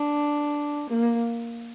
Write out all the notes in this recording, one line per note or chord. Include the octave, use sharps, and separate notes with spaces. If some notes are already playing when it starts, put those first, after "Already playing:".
Already playing: D4
A#3